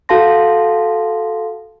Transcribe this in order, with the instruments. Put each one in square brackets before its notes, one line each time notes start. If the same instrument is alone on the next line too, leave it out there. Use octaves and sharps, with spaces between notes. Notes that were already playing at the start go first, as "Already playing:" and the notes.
[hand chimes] F#4 A4 F5 A5 C6 A#6